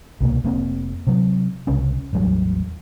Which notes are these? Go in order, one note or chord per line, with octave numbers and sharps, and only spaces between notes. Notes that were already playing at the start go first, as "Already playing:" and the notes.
C2 B2 A#3
F1 A#3 C4
C3 F#3
C2 C#3 C#4
A1 E2 F#3 G3